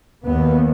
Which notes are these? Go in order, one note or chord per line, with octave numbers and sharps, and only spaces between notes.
D#2 B3